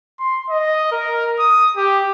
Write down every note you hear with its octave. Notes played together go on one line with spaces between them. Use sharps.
C6
D#5
A#4
D#6
G4